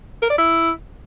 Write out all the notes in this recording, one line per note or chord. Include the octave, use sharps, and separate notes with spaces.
A#4
D5
E4